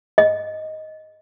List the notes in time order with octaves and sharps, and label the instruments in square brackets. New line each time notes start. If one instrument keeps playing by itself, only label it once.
[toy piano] D#5